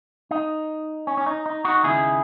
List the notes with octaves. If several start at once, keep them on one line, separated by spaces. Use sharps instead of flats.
D#4
C#4
C#4
D#4
D#4
D#4 F#4
D#2 C#3 G#3 E4 G#4